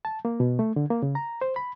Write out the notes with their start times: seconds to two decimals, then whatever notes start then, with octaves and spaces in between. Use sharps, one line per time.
0.05 A5
0.25 A#3
0.40 B2
0.59 A3
0.76 D3
0.90 A#3
1.03 C#3
1.15 A#5
1.41 C5
1.56 B5